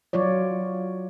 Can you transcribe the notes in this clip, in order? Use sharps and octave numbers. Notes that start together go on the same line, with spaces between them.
F#3 F4 C#5 D5